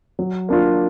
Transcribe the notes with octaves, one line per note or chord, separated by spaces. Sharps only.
F#3
A#3 D4 F4